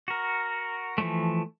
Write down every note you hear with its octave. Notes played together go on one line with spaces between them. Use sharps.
F#4 A#4
E3 F3 A3